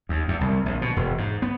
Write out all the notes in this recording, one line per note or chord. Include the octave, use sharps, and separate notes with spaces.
D#2
E2
C2
A#1
B2
E1
G#2
B3